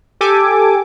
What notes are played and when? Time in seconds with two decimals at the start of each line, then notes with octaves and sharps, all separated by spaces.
0.21 G4 A4 G#5 D6